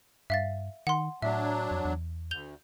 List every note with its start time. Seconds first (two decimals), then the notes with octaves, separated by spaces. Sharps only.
0.30 G2 E5 F5 A6
0.87 D#3 F#5 C6
1.22 A2 F#3 D4 E5
1.71 F2
1.85 E2
2.31 D2 G6 F7 G7